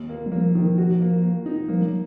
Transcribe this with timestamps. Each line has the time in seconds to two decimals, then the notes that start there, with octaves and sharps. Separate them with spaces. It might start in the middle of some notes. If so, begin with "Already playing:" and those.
Already playing: D#2
0.09 A#3
0.26 F#3
0.32 F3 A#3
0.55 D#3
0.78 F#4
1.01 A#3
1.23 A#3
1.46 D#4
1.69 F3 A#3
1.81 F#3